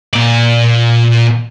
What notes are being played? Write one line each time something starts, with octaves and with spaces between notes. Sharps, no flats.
A#2 D5